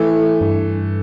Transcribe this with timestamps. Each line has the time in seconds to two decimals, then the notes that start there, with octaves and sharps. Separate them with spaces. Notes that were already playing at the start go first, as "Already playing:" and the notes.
Already playing: E3 A3
0.41 G2